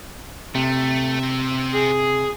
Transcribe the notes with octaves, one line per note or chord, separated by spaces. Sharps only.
C3 A3
C4 E5
G#4